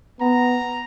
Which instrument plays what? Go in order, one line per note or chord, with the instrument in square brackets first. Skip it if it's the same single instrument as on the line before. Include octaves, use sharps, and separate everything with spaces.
[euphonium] B3 [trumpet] A#5